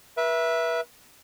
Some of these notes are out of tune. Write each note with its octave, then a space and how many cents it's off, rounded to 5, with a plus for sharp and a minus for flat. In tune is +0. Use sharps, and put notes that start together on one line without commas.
B4 -35 E5 +0